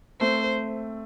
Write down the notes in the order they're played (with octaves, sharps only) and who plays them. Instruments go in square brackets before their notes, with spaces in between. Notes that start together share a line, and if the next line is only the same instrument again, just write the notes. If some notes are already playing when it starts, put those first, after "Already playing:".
[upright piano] A3 C4 [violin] C5